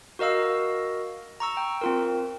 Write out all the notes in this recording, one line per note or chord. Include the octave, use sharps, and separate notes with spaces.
F#4 A#4 D#5 F5 E6
A#5 C#6 E6
G5
C4 F4 A#4